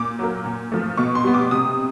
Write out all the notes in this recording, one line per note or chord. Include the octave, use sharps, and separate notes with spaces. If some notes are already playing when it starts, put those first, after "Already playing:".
Already playing: A#2 D6
F#3 A#3
A#2
F3 A3
B2 C#6
C6
G3 B3
D6
C3 D#6